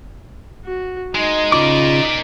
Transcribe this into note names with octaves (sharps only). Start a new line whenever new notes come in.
F#4
G#3 D#4 D#5
C#3 F4 A#4 D5 D6